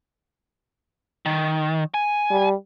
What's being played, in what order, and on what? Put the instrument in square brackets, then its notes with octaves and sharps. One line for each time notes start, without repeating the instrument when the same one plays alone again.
[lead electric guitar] D#3
G#5
[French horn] G3